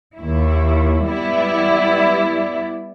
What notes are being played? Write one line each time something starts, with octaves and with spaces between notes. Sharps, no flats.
D#2 E4
G3 B3 E4 D5